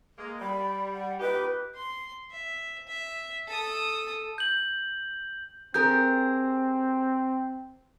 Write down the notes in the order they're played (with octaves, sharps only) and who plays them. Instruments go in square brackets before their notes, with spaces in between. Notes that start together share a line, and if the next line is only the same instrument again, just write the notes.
[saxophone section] G#3 A#3
[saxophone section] G3 [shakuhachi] B5
[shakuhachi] F#5
[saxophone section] A#2 D#4 G4 [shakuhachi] B4
[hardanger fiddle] C6
E5
E5
A4 D#6
[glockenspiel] G6 F#7
[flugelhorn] C4 [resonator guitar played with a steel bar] G4 G#4 A#4 [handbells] G6